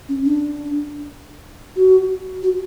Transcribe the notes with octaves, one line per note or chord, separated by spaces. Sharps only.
C#4
D4
F#4
F#4